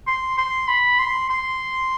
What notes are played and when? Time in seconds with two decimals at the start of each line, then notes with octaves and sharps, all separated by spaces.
0.07 C6
0.38 C6
0.68 B5
0.99 C6
1.30 C6